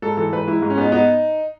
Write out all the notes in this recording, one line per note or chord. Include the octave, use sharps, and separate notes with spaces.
G#2 A4
E3 A4
G#2 B4
G#2 E4
G#2
C#4
B3 D#4
B3 D#4